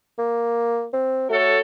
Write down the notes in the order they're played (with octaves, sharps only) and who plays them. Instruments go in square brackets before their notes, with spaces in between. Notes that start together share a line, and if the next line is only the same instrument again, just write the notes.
[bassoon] A#3
C4
[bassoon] A3 [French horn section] F#4 A4 C#5